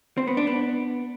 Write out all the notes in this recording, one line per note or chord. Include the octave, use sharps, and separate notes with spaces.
C4
B3
D4
B3